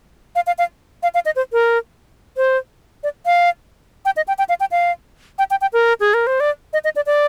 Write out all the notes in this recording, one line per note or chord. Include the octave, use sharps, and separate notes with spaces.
F5
F5
F5
F5
F5
D#5
C5
A#4
C5
D5
F5
G5
D#5
G5
G5
F5
G5
F5
G5
G5
G5
A#4
G#4
A#4
C5
D5
D#5
D#5
D5
D5